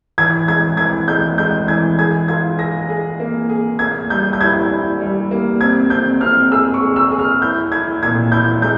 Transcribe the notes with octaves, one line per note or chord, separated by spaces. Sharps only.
E3 G#6
G#3 G#6
E3 G#6
G#3 G6
G#3 G6
E3 G#6
G#4 G#6
F4 G#6
G#4 A#6
G#4
A#3
G#4
A#3 G#6
G3 G6
G6
E4 G#6
E4
G3
A#3
C4 G#6
C4 G6
C4 F6
G#4 E6
C#6
G#4
E6
G#4
F6
E4 G6
E4 G#6
A#2 G#6
E4 G6
G#3 G6